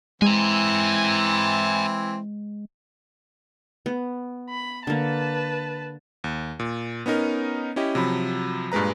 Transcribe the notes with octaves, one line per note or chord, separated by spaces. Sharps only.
E3 G#3 C4 E4 G#5 A#5
B3
B5
D3 A#3 B4 A5
D#2
A#2
B3 C#4 D#4 A#4
C#4 E4 G4 D#5
C3 F3 F#3 B5
G2 A#2 G#3 B4 A#5